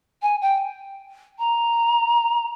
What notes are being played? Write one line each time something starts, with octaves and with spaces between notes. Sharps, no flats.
G#5
G5
A#5